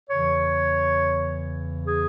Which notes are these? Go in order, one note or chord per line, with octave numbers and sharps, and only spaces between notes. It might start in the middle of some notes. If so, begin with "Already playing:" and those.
E2 C#3 E3 C#5
G#4